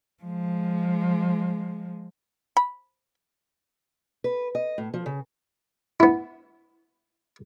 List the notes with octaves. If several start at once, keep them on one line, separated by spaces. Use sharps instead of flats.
F3 G#3
B5
B4
D#5
A2
F3
C#3
B3 E4